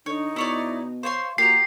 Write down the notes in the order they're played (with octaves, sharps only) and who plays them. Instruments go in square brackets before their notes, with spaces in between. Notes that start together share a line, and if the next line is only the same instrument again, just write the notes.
[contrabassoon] D3 [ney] D#4 [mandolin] C#5
[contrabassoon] B2 [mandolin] E4 C#5 D5
[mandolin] C5 C#5 C6 [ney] F5
[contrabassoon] A#2 [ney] F#4 [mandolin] G4 A#5 [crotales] C7